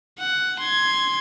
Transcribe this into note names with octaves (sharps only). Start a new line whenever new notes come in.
F#5
C6 G#6